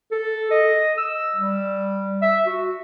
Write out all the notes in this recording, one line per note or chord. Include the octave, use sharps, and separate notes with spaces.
A4
D#5
E6
G3
E5
F#4